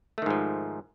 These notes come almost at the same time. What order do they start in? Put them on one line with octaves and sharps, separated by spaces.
A3 D#3 G#2 F3